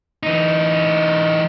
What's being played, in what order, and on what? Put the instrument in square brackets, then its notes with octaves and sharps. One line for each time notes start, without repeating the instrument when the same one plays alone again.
[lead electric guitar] E3 D#4